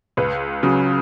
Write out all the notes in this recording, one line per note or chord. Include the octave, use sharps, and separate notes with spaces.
C#2 B4
C#3 F#3